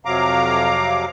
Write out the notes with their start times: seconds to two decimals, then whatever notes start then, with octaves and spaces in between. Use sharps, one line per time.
0.05 F2 C3 F#3 F5 A#5 D6